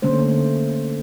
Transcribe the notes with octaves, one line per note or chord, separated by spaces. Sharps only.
D3 A3 A#3 C#4 C5